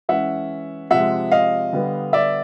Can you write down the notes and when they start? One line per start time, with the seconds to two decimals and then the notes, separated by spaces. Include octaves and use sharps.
0.09 E3 G#3 C#4 E5 F#5
0.91 C3 F3 G#3 E5 F#5
1.32 D#5 F5
1.73 D3 G3 B3
2.13 D5 E5